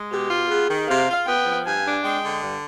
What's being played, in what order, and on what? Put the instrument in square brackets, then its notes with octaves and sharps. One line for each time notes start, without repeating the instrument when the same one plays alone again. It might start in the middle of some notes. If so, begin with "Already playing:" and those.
Already playing: [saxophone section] G#3
[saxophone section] B2 [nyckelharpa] G4
[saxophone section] F4
[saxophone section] B3 [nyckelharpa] G#4
[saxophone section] D#3
[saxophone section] C3 [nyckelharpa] F5
[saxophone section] F4
[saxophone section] B3 [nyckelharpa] G5
[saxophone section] F3
[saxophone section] G2 [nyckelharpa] G#5
[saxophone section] D4
[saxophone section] G#3 [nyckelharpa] G5
[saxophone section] D3
G2